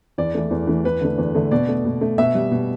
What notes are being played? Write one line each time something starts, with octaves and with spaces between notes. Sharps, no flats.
E2 D5
E3 A3
E2
E3 A3
E2 B4
D3 A3
E2
D3 A3
B2 D5
A3
B2
A3
B2 E5
G3
B2